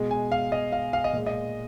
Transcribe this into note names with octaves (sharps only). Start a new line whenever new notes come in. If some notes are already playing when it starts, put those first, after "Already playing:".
Already playing: B2 G#3
G#5
F5
D#5
F5
F5
D#5
A#2 G#3
D#5